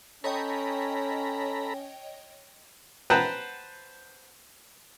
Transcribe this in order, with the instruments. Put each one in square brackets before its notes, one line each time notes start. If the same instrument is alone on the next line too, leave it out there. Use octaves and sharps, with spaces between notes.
[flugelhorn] C#4 [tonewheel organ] A4 A#5 B5 [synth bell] C#5 D#5 G5
[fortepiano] B4 C5 F#5 G5 A5 A#5